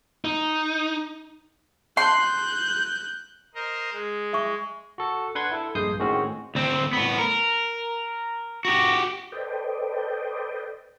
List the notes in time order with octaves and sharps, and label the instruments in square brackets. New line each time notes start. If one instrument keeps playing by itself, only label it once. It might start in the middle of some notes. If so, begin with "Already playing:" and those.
[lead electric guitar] D#4
[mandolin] C6 [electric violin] F#6 G6
[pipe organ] A#4 C5 D#5
G#3
[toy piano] E5 C#6
[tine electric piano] F#4 A4
D4 B4 F#5 C6 G#6
E4 A4
A#1 G2 G#3 D#6 G6 C7
A2 D#3 G#3 C4 C#4 F#4
[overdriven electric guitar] D2 C4
A2 B3
A#4
F#4 G4
[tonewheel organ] A4 B4 C5 D5 D#5 G5